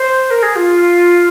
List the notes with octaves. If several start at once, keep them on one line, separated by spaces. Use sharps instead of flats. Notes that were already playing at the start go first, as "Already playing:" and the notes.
Already playing: C5
A#4
G#4
F4